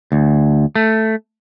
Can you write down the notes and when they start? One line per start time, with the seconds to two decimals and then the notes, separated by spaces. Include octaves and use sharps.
0.12 D2
0.75 A3